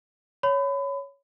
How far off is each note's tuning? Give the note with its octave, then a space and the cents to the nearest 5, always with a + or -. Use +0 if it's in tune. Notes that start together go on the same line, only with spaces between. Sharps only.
C#5 +5 B5 +30